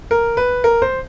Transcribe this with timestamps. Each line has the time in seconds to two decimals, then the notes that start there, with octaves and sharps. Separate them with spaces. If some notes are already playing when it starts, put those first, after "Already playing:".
0.11 A#4
0.37 B4
0.64 A#4
0.82 C5